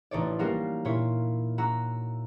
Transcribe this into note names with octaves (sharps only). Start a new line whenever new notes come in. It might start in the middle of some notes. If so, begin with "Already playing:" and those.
A1 D#4 C#5 D5
G3 A#3 F#4 A#4 F5
A#2 E4 F4 C#5
F#4 A#5 E6